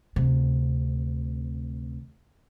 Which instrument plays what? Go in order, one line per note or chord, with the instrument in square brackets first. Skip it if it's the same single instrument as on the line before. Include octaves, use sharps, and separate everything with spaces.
[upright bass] D2 C3